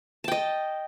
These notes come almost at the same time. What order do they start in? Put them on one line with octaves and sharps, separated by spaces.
A5 G5 D#5